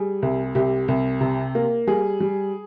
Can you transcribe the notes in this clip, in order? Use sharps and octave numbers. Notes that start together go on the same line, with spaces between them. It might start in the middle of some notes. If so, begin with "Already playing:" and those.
Already playing: G3 G#4
C2
C2 G4
C2
C3
A#3
G3 G#4
G3